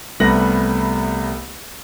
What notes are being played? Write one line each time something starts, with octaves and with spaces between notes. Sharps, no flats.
C2 G3 A3 B3 A#6 F#7